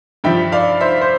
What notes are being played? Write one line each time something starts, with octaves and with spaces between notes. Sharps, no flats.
G2 F3 E5 G5
D5 F5
C5 E5
C5